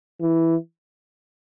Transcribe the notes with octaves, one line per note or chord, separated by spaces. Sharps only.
E3